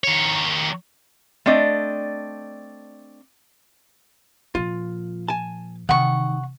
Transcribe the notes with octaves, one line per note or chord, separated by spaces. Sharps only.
D#3 C#5
A3 C4 D4 D5 D#5
A#2 F3 F4
G#5 A5
C3 D#3 E3 F#5 C#6